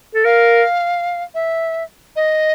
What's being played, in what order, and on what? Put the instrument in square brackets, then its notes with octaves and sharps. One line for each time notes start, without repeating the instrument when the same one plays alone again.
[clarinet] A4
[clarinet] A#4 [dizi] F5
[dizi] E5
D#5